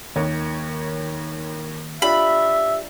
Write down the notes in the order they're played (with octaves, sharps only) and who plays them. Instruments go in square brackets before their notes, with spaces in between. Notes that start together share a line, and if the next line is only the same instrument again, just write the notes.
[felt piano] D#2 C#5 [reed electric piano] D#3 A#3
[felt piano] D4 F4 [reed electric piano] G4 [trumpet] E5 [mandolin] B5